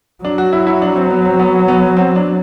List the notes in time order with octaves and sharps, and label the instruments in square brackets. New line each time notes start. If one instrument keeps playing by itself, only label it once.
[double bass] F#3 [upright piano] D4
[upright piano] F#4
E4
E4
D4
C4
B3
C4
B3
B3
C4
D4